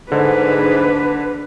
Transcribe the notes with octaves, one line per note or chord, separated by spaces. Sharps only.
G#2 D3 D4 B4